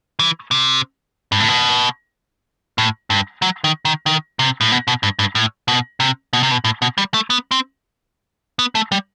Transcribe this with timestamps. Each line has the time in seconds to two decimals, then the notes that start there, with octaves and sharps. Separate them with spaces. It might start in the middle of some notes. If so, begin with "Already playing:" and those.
0.19 E3
0.51 C3
1.32 G2
1.40 A2
1.49 B2
2.78 A2
3.10 G2
3.42 F#3
3.64 D#3
3.85 D#3
4.06 D#3
4.39 C3
4.61 A2
4.72 B2
4.88 B2
5.03 G2
5.19 G2
5.35 A2
5.68 B2
6.00 C3
6.33 B2
6.43 C3
6.51 B2
6.64 A2
6.82 B2
6.98 G3
7.14 A3
7.30 B3
7.51 C4
8.59 B3
8.75 A3
8.92 G3